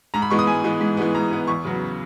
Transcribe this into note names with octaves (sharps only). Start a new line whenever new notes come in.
G#2 A#5
B5
E3 G#3 B3 C#6
D#6
G#2 G#5
E3 G#3 B3
G#2
E3 G#3 B3
G#2 A#5
E3 G#3 B3
E2 C#6
C#3 F#3 B3